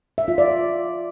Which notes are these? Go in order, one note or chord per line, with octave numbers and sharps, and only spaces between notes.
E5
F4
D5